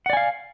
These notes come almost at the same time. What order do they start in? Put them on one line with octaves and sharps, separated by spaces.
F#5 D5 G#5 F5